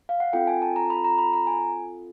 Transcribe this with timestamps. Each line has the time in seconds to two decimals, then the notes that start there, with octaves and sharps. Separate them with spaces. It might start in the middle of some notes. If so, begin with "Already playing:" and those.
0.09 F5
0.20 F#5
0.33 C4 F4 A4 G5
0.47 G#5
0.62 A5
0.76 A#5
0.90 B5
1.04 A#5
1.18 B5
1.33 A#5
1.47 G#5